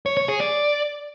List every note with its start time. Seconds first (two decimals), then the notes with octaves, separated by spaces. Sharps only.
0.06 C#5
0.17 C#5
0.28 G#4
0.40 D5